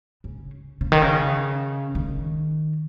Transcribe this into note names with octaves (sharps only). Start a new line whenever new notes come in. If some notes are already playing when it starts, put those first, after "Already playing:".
C#3
C#3
D#3
C#3
D#3